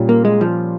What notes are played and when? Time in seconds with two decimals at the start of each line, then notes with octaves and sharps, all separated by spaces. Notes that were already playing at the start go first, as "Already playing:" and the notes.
Already playing: A#2 G3 C#4 F4
0.09 A#3
0.25 G#3
0.41 F3